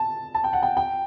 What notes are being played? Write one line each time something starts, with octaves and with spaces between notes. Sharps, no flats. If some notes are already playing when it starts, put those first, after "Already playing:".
Already playing: A5
A5
G5
F#5
G5
G5